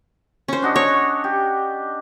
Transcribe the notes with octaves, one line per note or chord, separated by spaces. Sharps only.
C#4 C5
D4 F#4 D#5
C#5
G4